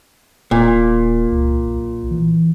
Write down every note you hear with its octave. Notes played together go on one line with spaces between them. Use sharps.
D1 A#2
C#2
B1
E3